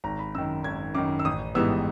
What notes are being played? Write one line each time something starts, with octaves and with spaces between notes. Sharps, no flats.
G#1 A#5
B5
F#2 D#3 E6
G#1 G#6
F#2 D#3 D6
E6
A1 D#6
G#2 E3 G3 B3 E6